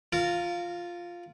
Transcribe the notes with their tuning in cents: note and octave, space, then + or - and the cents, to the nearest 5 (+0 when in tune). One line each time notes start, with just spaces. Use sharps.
F4 +0 A#4 -25